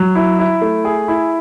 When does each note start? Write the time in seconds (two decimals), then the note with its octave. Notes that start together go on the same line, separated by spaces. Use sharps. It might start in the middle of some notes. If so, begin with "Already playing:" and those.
Already playing: F#3
0.15 E4
0.39 E4
0.62 A3
0.85 G#4
1.08 E4